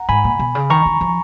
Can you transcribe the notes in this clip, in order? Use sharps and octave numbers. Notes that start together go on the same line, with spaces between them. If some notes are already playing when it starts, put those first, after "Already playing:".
Already playing: F#5 A#5
G#2 G#5 B5
A#2
B2
C#3
D#3 A#5 C#6
D#3
F3